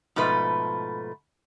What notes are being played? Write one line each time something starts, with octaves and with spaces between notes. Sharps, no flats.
G#2 B2 F3 A3 B4